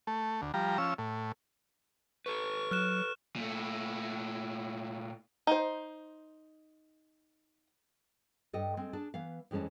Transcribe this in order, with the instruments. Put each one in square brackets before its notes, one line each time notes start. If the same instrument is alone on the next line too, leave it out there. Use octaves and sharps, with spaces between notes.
[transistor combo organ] A3
D2
F3 G3 A#5
F3 C#4 E6
A2
[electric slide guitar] A4 B4 [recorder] C#6
[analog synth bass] F#3 [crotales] F6 F#6 E7
[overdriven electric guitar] A#2 A3
[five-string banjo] D#4 C5
[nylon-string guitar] G2 A4 D#5 G5
G#3 C4
D4 G#4 A5
E3 B3 F5
F2 E3 G#3 C#4 A5